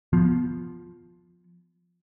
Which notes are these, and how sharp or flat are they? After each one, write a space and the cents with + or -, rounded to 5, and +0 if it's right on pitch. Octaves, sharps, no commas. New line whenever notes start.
F3 +0 B3 +0